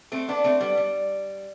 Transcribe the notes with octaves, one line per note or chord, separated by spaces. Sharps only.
A3 C4
B3 D4
A3 C4
G3 B3
G3